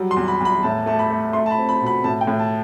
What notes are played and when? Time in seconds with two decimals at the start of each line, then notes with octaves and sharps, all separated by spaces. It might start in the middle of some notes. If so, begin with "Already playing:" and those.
Already playing: F#3 G3
0.11 C6
0.16 E2
0.28 B5
0.40 E2
0.45 B5
0.63 A2 A5
0.86 A3 A5
0.99 B5
1.10 A3
1.33 A3 C6
1.46 A5
1.51 B5
1.57 C4
1.69 B5
1.81 B2
1.86 B5
2.04 A2 A5
2.21 G5
2.27 A2
2.39 A5